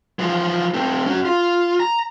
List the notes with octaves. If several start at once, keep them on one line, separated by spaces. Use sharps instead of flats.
E3 F3
A3 C4
C#4 F#4
F4
A#5